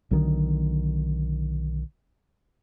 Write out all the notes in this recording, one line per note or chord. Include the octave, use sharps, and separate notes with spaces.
B1 D3 D#3